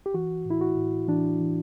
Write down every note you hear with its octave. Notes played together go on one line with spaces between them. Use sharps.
G4
E3 F#4
A2
E4
F#4
A2
E3 D4
E3